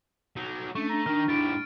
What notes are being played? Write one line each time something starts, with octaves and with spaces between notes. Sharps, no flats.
F#3 D#4
A3 C#4 D4 C#6
D4 A#5
D#3 D4 F6
G#2 E4 G4 A6 D7